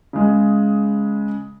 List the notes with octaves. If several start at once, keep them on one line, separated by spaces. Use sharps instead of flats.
C#3 G#3